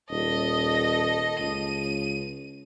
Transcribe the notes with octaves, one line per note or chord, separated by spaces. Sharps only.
D#1 A4 D#5
C#2 D#7